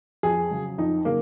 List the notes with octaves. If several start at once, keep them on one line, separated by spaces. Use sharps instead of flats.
F2 G#4
C#3 F#3
F2 D#4
C#3 F#3 A#3